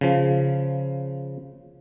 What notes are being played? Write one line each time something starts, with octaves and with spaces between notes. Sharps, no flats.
C#3 F3